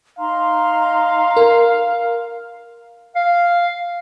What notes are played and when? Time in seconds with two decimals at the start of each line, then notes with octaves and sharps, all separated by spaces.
0.19 D#4 F5 A#5 C6
1.37 A#4
3.15 F5